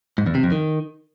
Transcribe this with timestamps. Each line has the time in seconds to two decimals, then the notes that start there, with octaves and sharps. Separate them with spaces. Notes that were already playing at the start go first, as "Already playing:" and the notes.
0.18 G#2
0.26 E2
0.35 C3
0.43 F2
0.52 D#3